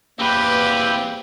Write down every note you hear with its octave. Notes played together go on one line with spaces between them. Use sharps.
E2 A#3 C4 G4 B4